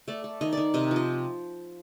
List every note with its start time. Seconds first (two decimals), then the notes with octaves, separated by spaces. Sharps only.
0.08 A3 D5
0.24 A3
0.41 D#3 D#5
0.53 D#3 D5
0.74 C3 D#5
0.91 F3
0.96 D#5